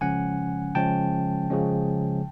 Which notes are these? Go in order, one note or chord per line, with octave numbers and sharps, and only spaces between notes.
C#3 F3 G#3 C#4 F#5 G#5
C#3 F3 G#3 C#4 G5 A5
C#3 F3 G#3 C#4